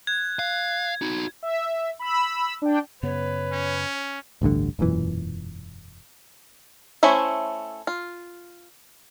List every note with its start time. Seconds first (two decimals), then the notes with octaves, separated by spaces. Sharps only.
0.07 F#6 G#6
0.39 F5
1.02 D#4 F#4
1.43 E5
1.99 B5 E6
2.62 D4 G5
3.03 F#2 C#3 B3 B4 C#5
3.52 C#4
4.42 A1 D2 G2 D3
4.79 E1 F#2 A#2 E3
7.03 A3 C#4 E4 C5 E5
7.87 F4